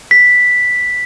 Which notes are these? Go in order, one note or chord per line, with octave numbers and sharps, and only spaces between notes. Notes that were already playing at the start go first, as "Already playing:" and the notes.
B6